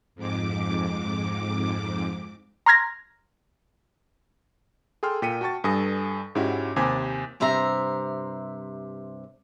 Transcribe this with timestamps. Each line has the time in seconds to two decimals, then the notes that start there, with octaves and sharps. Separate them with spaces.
0.15 F2 G#2 D6
2.66 A#5 C6 F6 G#6 A#6
5.03 G#4 A4 G5 C6 F6
5.22 A#2 G5 B6 C#7 D#7
5.41 F#4 G5 A5 C#6 A6
5.64 G2 A4 G#5 D#6 A#6
6.35 G#2 C#4 E4 F#4 G4
6.76 D#2 C3 C5 G#5 D6 G#6
7.40 G2 C3 C5 E5 A#5